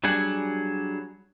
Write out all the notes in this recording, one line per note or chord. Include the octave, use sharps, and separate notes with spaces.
F#3 G3 D4 G#4 F#5